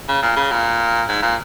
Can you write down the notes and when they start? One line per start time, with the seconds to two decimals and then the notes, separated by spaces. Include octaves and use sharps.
0.08 C#3
0.22 A#2
0.36 C#3
0.51 A#2
1.09 G#2
1.22 A#2